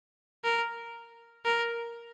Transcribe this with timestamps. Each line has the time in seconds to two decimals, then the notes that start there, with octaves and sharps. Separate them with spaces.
0.44 A#4
1.45 A#4